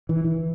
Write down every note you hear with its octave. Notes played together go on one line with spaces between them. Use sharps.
E3
E3